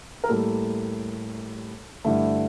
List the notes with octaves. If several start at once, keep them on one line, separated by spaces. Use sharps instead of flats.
A#4
A2 G3 A#3 A4
G2 D3 A3 E4